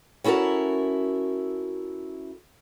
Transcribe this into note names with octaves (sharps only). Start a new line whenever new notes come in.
C#4 E4 F#4 A4 A#4